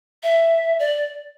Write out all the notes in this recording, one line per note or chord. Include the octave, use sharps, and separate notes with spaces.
E5
D5